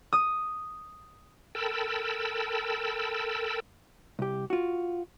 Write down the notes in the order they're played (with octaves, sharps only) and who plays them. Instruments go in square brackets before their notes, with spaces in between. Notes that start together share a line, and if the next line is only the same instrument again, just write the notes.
[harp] D#6
[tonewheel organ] A4 A#4 G5 A5 B5 E6
[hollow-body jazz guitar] C2 G4
F4 F#4